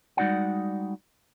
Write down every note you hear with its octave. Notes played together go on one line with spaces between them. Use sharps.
G3 G#3 D#4 F#4 D5 F#5